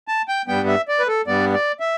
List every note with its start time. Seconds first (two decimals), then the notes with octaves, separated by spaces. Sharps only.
0.08 A5
0.28 G5
0.48 G2 G3 B3 G5
0.68 E5
0.88 D5
0.99 B4
1.08 A4
1.27 G2 G3 B3 D5
1.54 D5
1.80 E5